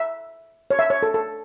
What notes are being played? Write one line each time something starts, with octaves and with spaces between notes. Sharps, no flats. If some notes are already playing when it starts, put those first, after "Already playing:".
Already playing: E5
C#5
E5
C#5
A4
A4